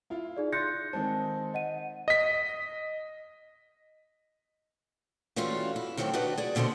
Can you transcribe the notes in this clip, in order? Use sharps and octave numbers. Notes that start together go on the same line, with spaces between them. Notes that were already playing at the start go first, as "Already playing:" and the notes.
E4 F4 F5
D#4 G#4 D5
C6 F#6 G6 A6 A#6 C#7
D#3 G#3 C4 A5
D#5 F#5 D#7
D#5 B6
E3 G3 A3 C#4 F4 F#4
E4
D#3 F#3 A3 C4 F#4 G4
D4 D#4 F#4 G4 B4 F#5
G#4 D5
D#2 B2 D3 F4 C5 D#5